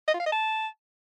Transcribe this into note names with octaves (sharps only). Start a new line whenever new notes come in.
D#5
F4
F5
D#5
A5